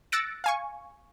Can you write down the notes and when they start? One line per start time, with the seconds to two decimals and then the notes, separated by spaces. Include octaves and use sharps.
0.12 E6 F#6 A6 A#6 C#7 D7
0.44 F5 G#5 C#6